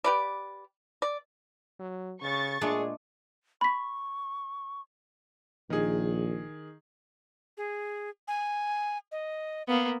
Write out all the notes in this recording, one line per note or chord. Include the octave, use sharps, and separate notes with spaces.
G4 B4 D5
D5
F#3
C#3 C#6 A6
A#2 G#3 A3 D4 G#4
B5 C#6 B6
A#1 D#3 G#4
G#4
G#5
D#5
A#3 B3 F5